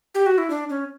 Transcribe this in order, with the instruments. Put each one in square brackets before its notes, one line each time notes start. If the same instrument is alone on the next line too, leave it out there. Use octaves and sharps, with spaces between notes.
[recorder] G4
F#4
E4
D4
C#4